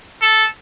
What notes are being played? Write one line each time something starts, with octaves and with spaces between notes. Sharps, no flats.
A4